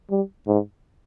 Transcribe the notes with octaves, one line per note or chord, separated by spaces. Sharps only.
G3
G#2